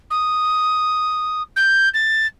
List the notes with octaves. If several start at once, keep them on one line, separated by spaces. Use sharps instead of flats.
D#6
G6
A6